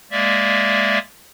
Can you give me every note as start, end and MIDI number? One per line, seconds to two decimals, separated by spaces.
0.11 0.98 56
0.11 0.98 58
0.11 0.98 74
0.11 0.98 76